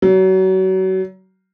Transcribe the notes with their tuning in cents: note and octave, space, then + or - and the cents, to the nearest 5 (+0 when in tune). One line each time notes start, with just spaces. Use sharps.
F#3 +30